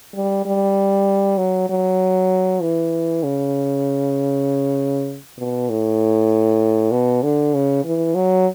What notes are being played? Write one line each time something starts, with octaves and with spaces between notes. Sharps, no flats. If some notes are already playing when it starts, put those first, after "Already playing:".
G3
G3
F#3
F#3
E3
C#3
B2
A2
B2
D3
C#3
E3
F#3